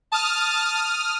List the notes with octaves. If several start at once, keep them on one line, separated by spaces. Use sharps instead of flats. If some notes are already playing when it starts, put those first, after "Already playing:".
A5 D#6 F6